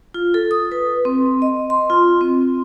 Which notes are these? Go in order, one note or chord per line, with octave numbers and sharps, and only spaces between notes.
F4
A4
D#6
B4
C4
D#5
C6
F4
C4